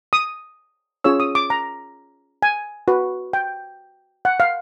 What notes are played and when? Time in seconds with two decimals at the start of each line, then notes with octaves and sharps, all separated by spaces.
0.13 D#6
1.04 C#4 F4 G#4 C#5 E6
1.20 D#6
1.35 D6
1.50 A#5
2.42 G#5
2.88 F#4 B4
3.33 G5
4.25 F#5
4.40 F5